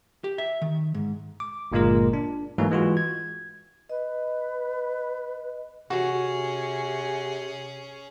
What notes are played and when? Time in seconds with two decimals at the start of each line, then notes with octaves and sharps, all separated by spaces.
0.24 G4
0.38 E5
0.62 D#3
0.94 G#2
1.40 D6
1.72 G1 A#2 G#3 A#3 F4 A#4
2.13 D4
2.58 G#2 E3 F#3 A3 A#3 F#4
2.70 E3 G#3 F4 F#4
2.97 G#6
3.90 B4 D#5
5.90 C3 C#4 F#4 G#4